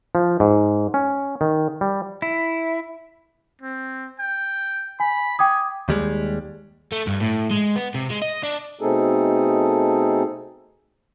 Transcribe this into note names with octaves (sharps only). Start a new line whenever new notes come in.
F3
G#2
C#4
D#3
G3
E4
C4
G5
G#5 B5
G5 G#5 D6 D#6
D#2 G3 G#3
A3
G2
A2
G#3
B3
C3
G#3
D#5
D4
B2 A3 C4 D#4 G#4 A4